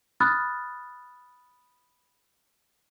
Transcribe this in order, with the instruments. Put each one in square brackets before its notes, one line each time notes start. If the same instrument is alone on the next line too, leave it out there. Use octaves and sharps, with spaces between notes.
[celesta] B5 D#6 F6 F#6 A6